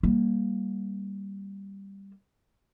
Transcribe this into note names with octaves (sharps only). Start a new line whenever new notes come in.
G3 A#3